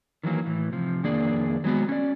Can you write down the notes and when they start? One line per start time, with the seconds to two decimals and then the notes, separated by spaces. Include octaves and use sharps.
0.23 D#3 E3 F#3 A#3
0.46 A2 E3
0.73 C3 F3
1.03 F2 D#3 A#3 D4 G#4 D5
1.64 F#3 G#3 B3 F#4
1.89 C#4 D5